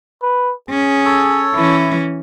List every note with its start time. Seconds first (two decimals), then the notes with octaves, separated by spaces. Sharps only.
0.23 B4
0.70 C#4 G#4
1.05 A4 C#5
1.55 E3 C#4 E4